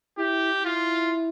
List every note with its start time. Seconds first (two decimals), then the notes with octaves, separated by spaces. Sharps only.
0.18 E4 G4
0.65 E4 F4